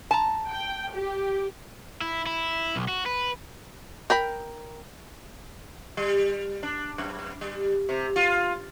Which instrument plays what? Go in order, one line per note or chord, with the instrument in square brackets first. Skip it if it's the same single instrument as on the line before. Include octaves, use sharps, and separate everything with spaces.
[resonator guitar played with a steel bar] A5 A#5
[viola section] G5
G4
[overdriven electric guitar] E4
E4
B1
F#4
B4
[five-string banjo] A#4 G5 B5
[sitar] G3
D4
F#2
G3
C3
F4